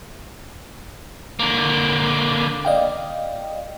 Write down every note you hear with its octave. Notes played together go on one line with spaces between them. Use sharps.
D3 A#3
D5 D#5 F5 G5